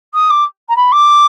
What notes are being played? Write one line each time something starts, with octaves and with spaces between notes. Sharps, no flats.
D#6
D6
A#5
B5
D6